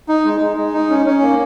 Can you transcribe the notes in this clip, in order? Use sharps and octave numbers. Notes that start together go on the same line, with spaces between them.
D#4
G#3
G#3
G#3
D#4
C#4
C#4
A#3